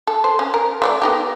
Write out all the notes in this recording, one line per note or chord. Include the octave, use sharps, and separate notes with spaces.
A4
C5
C#4
A#4
A3 C#5 D5
B3 D#4 G4